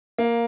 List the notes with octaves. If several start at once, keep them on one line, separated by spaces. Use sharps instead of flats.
A#3